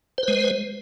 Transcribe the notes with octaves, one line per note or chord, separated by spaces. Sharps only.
G#3 B4 C5